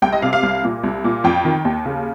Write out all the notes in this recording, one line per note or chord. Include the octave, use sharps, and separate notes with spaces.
C2 G5
D#5
C3 F5
F5
C2
A#2
C2
A#2
F2 G5
D#3
D#2
C#3